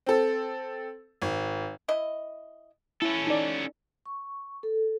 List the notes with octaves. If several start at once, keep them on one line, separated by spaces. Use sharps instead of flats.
C4 A4
G#1
E4 D#5
C#4 E4 A4
D#4 D5
C#6
A4